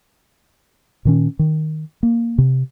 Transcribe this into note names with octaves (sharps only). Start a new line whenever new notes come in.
A#2 D#3 C#4
D#3
A#3
C3